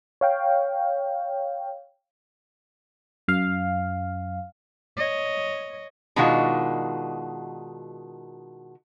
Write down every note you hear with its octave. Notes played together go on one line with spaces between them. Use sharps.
C#5 F5 G5
F#2 F5
C#5 D#5
B2 D#3 G#3 D4 F4 F#4